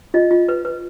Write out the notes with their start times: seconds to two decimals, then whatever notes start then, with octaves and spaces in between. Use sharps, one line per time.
0.14 F4 D#5
0.31 F4
0.49 B4
0.65 B4